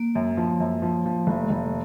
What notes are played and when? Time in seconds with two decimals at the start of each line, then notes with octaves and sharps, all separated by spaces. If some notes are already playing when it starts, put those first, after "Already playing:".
Already playing: A#3
0.15 F#2
0.37 F3
0.60 F#2
0.82 F3
1.05 F3
1.27 F1
1.50 F1